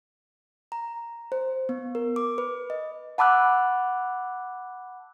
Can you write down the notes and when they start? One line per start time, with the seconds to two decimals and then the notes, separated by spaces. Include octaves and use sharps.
0.72 A#5
1.32 C5
1.69 B3
1.95 A#4
2.16 D6
2.38 B4
2.70 D#5
3.18 F#5 A5 B5 D6 E6 F#6